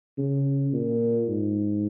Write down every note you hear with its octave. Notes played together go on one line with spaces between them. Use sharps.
C#3
A#2
G#2